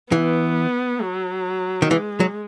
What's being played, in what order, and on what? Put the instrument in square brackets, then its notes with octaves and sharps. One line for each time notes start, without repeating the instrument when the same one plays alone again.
[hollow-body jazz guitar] E3 [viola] B3
[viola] F#3
[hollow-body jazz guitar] D#3
[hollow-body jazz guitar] E3 [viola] G#3
[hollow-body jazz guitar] F#3